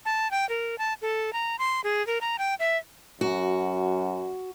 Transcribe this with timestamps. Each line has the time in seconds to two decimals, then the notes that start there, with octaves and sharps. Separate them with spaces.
0.05 A5
0.31 G5
0.49 A#4
0.78 A5
1.02 A4
1.33 A#5
1.59 C6
1.84 G#4
2.07 A#4
2.21 A#5
2.39 G5
2.60 E5
3.21 F#2 F#4